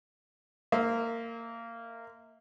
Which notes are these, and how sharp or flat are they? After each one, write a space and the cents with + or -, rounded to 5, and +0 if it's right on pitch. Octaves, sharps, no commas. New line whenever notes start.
A#3 -20 C5 -35 E5 -35